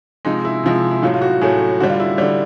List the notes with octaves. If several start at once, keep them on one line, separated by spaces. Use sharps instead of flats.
C3 F3 G#3 D#4
E4
C3 F3 G#3
E4
A2 F#3 A3 F4
F4
F#4
A2 F#3 A3 G#4
D3 G3 F#4
F4
E4
D3 G3